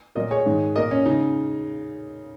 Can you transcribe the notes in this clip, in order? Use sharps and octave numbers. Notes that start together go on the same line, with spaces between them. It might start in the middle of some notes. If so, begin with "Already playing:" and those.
A#2 F#3 A#3 A#4 D#5
G#4 C#5
G#2 D#3 G#3
A#2 A#3 A#4 D#5
C#4
C#3 G#3 D#4